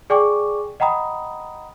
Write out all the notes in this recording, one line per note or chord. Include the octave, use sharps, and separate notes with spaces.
G#4 D5 G5 G#5 C#6 D6
D#5 F#5 G5 A#5 B5 D#6